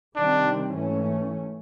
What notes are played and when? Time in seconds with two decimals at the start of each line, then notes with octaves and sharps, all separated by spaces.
0.16 C3 D#3 G3 C4 D4
0.74 G#2 E3 A3 C#4